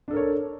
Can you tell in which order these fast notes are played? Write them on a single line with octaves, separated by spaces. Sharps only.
D4 A4 A#4 C#5